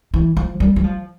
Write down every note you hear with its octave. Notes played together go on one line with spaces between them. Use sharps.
E3
F3
G3
G3
F3